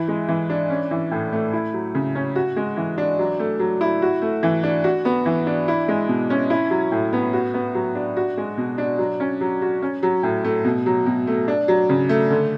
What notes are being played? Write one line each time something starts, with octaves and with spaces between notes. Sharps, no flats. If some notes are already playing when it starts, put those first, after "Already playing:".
Already playing: E3 E4
G#3
E3
D4
C#4
E3
A2
A3
E4
F#3
C#3
C#4
F#4
G#3
E3
D4
F#3
A3
F#3
E4
F#4
A3
E3
D4
F#4
B3
E3
D4
E4
G#3
B2
C#4
E4
F#3
A2
B3
F#4
B3
F#3
D4
F#4
G#3
B2
D4
F#3
C#4
F#3
F#4
C#4
F#3
A2
A3
B2
F#3
B2
A3
D4
F#3
C#3
A3
D3